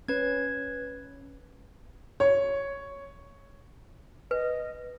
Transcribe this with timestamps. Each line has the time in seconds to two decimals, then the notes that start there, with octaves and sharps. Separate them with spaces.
0.08 C#4 B4 G#6
2.20 C#5
4.31 B4 D#5